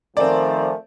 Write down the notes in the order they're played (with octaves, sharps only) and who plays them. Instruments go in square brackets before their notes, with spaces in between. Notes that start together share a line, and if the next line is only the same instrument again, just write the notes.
[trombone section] D#3 F3 A3 [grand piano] C4 D5 [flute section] A#4 G#5 A#5